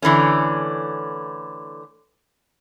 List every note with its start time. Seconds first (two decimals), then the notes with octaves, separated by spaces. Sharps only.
0.02 D3 E3 A3 C#4